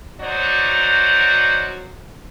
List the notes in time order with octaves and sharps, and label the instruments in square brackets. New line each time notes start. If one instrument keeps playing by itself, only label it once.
[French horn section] F#3 D#4 F#4 C5 D5